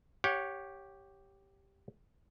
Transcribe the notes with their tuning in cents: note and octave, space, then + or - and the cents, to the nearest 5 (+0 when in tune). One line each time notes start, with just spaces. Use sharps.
G4 +0 C#5 +0 F#5 -30